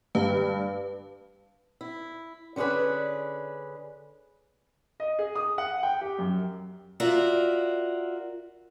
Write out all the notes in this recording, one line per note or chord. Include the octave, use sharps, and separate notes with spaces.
G2 B4 F5 A5
E4
D3 C#4 D4 G#4 B4
D#5
G#4
D#6
F#5
G5
G4
F#2
F4 F#4 A#4 D5 E5